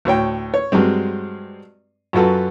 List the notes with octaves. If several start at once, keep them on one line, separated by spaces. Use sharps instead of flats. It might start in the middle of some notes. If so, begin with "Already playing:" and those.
D2 A2 C#5 G5
C#5
G2 F#3 G#3 C4
F#2 F#3 F4 F#4 A4 B4